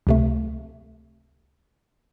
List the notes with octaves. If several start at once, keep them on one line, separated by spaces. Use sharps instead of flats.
C#2 C3 A3